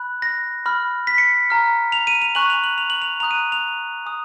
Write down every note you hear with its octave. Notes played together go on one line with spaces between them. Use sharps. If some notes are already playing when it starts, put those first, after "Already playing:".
Already playing: B5 F#6
A#6
B5 F6
B6
C#7
A#5 F6
F7
D#7
F7
G#5 C#6 F#6 F#7
F7
F#7
F7
F#7
F7
A#5 D#6 F#6 F7
D#7
F7
G#5 D#6 F#6